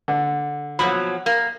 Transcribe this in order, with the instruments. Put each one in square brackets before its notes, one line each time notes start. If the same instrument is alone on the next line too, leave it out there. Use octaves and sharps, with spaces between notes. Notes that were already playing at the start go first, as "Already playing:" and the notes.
[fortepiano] D3
[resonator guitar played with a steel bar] B2 F3 F#3 [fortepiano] B5
[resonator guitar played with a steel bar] A#3